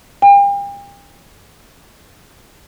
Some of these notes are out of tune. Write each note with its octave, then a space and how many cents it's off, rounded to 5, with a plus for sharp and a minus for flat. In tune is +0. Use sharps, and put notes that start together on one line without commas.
G5 +40